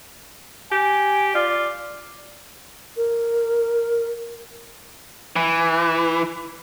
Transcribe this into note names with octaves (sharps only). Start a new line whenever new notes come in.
G4 G#5
F4 D5
A#4
E3